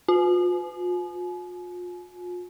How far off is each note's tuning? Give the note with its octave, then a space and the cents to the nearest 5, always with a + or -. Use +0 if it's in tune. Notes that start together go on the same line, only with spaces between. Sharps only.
F4 +40 G#5 +40